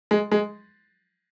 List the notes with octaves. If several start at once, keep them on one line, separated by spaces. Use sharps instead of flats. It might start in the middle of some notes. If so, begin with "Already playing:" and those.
G#3
G#3